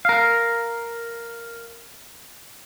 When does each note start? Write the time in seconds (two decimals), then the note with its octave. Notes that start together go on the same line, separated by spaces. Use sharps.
0.05 A#4 F5